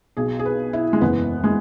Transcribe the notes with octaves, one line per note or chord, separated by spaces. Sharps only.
B1 B2 G#4
G#4
B4
E4
G#3
F#1 E2 E3 B3
G#3